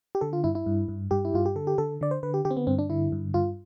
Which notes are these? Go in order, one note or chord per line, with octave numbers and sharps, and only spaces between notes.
G4
D3 A4
F4
G2 E4
E4
G2
G2
G2 G4
E4
G2 F4
G4
D3 A4
G4
D3 A4
D3 D5
C5
D3 B4
G4
D3 G4
C4
B3
G2 C4
D4
D3 E4
G2
G2 F4